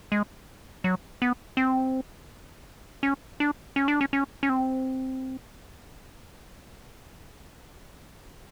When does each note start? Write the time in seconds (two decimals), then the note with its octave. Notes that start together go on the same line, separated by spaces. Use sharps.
0.12 G#3
0.84 F#3
1.22 B3
1.57 C4
3.03 C#4
3.40 D4
3.76 C#4
3.88 D4
4.01 C#4
4.13 C#4
4.43 C#4
4.49 C4